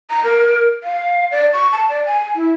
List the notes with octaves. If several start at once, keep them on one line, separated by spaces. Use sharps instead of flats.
A#5
A#4
F5
D5
C#6
A5
D5
G#5
E4